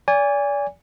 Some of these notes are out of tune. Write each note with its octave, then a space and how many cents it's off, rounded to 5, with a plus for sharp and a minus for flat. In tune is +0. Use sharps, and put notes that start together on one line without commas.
D5 -35 G#5 -20